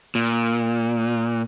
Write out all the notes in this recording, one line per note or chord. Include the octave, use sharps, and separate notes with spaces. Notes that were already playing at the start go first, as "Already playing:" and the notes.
A#2